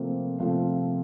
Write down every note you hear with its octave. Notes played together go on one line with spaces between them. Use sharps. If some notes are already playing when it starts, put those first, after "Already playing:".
Already playing: C3 F3 A3 A#3 C4
C3 F3 A3